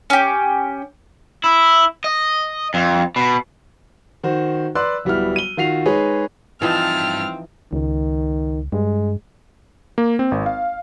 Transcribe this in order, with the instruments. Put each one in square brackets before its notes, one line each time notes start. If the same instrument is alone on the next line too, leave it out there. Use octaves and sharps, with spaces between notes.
[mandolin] C#4 G4
[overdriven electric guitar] E4
D#5
F2
B2
[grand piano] D#3 F#4 C5
B4 D5 C6 E6 F#6
D1 G3 B3 E4 F6
D#7 G7
D#3 F4 F#4 C7 F7
G#3 D#4 G#4 B4 C#5
[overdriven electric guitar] G2 A5 [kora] E3 F3 D#4 [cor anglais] C4 [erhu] F6
[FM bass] C#2 [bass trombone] D#3
[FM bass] G2 [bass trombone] G#3
[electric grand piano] A#3
C4
G#1
F5